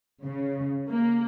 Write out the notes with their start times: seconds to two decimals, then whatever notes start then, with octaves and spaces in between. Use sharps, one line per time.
0.23 C#3
0.90 A#3